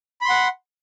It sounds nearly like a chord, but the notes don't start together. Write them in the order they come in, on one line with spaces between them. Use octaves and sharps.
B5 C6 F#5